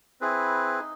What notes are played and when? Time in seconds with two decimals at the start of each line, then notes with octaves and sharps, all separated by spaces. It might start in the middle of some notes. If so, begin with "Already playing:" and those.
0.21 C4 E4 G#4 B4
0.80 D#4